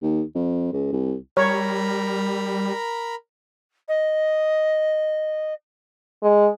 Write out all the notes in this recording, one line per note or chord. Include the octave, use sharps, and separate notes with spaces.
D#2
F2
C#2
C2
G3 A#4 C#5 A#5 B5
D#5
G#3